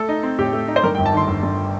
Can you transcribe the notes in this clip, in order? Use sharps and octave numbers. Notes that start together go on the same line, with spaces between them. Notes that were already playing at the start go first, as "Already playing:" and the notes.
Already playing: A3 A4
D#4
C4
A2 G4
A3
D#4
C5
G2 A#4
G5
G1
A5
D#3 C6
G1
G2